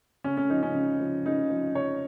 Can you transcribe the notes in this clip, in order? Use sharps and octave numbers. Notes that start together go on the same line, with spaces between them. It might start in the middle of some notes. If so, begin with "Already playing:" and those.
C#3 C#4
C#4
F3 D#4
C#4
C#3
F3
C#3 D#4
F3
C#3 C#5